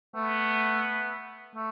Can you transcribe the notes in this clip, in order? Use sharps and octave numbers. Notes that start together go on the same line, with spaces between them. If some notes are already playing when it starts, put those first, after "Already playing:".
A3 B3
A3